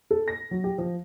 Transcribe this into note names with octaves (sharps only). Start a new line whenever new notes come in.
A4
A#6
F#3
G4
F3